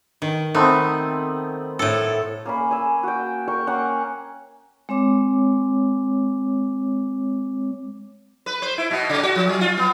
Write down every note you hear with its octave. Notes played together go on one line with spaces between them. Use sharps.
D#3
A3 B3 C4 D#4
A2 A4
A#3 C#4 B5
G#5 E6
F#4 G5
A#4 G5 C#6
A#3 C#4 F#5 C#6
G#3 C4 C#5 D6
B4
C5
E4
B2
C#3
F#4
F3
F#3
F4
B3